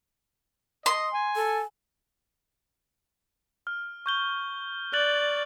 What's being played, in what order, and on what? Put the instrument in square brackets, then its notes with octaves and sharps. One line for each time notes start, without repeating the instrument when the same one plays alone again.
[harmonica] D#5 [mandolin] C6
[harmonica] G#5
[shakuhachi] A4
[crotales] F6
C#6 G6 G7
[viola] D5 [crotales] F#6 A6 F#7